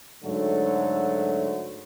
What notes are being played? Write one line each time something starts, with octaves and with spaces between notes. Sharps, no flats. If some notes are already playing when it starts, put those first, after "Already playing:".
G#2 D3 F#3 A3